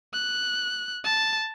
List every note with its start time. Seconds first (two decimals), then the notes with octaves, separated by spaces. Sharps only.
0.13 F#6
1.04 A5